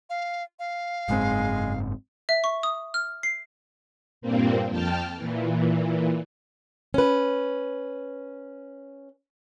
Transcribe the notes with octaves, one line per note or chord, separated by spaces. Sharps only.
F5
F5
F#1 G#2 G#3 C4
E5
C#6
D#6
F6
C7
G2 A#2 A#3 C4
F2 G5 A5 F6
A#2 E3
C#4 B4